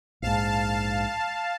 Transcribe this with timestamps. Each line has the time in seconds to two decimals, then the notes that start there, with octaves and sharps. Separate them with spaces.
0.22 A#1 G#2 F5 A5